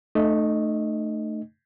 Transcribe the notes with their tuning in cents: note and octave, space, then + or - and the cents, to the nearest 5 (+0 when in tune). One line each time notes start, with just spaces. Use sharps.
A3 +0 D#4 -45 D#5 +0